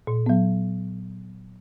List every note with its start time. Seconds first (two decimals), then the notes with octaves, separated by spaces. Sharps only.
0.07 A#2
0.26 F#3 B3